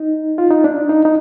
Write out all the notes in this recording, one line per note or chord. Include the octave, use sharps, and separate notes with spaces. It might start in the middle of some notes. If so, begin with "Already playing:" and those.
Already playing: D#4
F4
D#4
D4
D#4
D#4